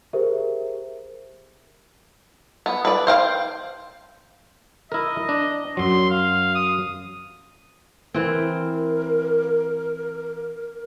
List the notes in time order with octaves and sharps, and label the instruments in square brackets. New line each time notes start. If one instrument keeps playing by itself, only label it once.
[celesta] G4 G#4 A#4 C5 E5
[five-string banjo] B3
B4 D5
C5 F5 G5
[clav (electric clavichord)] E4 A#4 [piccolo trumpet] D#5
[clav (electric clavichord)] D4
[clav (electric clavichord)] F#2 F#3 [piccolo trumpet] C6
[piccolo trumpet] F5
D#6
[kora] E3 C4 [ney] A#4